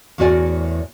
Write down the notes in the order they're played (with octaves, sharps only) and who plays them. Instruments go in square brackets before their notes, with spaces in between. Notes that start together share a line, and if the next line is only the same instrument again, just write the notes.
[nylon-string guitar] E2 A2 F#4 A#4 D5 G#5